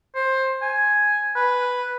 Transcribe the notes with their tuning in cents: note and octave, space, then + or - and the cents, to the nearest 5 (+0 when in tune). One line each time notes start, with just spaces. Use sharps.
C5 +15
G#5 +5
B4 +0